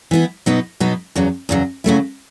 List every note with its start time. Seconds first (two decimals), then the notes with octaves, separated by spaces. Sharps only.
0.11 E3 B3 E4
0.46 B2 F#3 B3 D#4
0.80 B2 F#3 B3 D#4
1.15 E2 C#3 F#3
1.49 E2 C#3 F#3
1.84 C#3 F#3 A3 E4